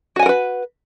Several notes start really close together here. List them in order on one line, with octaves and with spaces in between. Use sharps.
F#4 G#5 F#5 A#4 B4